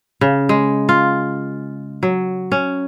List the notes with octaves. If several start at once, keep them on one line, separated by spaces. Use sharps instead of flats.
C#3
G#3
F4
F#3
C#4